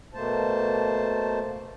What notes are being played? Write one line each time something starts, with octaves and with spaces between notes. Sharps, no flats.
B2 A3 A#3 C5 A5